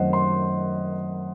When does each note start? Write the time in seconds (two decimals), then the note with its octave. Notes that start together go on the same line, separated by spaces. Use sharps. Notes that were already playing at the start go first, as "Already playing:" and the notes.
Already playing: F#2 D#3 A3 C4 C5 D#5 F#5
0.13 C6